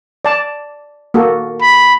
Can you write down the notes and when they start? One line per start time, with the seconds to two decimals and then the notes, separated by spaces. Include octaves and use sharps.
0.25 D5 A5
1.14 A#3 F#4 A4
1.62 B5